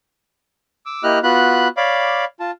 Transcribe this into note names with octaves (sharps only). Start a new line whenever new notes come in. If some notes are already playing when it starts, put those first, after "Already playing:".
D6 E6
A#3 E4 G4 D#5 F6 F#6
B3 F4 F#4 B5 F#6
C#5 D5 F5 B5 D6
F4 A5